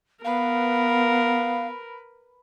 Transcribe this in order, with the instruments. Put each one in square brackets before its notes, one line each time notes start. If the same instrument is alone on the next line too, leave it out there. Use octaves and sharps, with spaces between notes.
[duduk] B3 [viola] A#4 [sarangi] B4 [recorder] F5